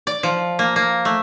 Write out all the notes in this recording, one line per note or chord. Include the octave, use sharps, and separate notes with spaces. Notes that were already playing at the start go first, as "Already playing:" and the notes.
D5
F3
A#3
A#3
A3